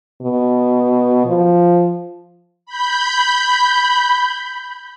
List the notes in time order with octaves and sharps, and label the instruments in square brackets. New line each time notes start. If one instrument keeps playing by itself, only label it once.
[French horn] B2
F3
[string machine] B5 G6